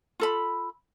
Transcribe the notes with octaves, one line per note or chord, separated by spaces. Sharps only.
F4 A4 B5